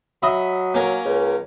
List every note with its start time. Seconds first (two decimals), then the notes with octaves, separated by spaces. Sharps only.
0.23 F#3 D#5 E5 B5
0.74 A#3 C#4 A#4
1.05 C#2